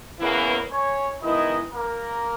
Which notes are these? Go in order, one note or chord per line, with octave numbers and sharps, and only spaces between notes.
E2 C#3 E3 A#3 B3 E4 B4
C#4 C#5
D#3 G#3 B3 D#4 E4 D#5
A#3 A#4